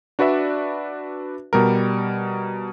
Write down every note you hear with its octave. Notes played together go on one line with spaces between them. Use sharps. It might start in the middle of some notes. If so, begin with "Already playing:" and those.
D4 F#4 B4 D5 E5
B2 G3 A#4